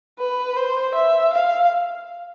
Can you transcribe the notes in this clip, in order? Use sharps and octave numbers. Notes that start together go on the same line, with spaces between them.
B4
C5
E5
F5